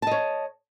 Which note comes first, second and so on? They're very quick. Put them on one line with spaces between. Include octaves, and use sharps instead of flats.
A5 D#5 C#5